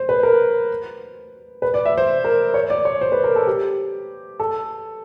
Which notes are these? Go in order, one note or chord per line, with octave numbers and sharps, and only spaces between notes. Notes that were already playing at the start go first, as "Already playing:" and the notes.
Already playing: C5
B4
A#4
B4
D5
E5
C5
A#4
C#5
D5
C#5
C5
B4
A#4
A4
G4
A4